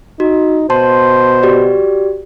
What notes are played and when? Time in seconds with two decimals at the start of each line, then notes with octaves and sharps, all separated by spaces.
0.20 D#4 F#4
0.70 B2 C5 A5 C6
1.43 F#4 G4 D5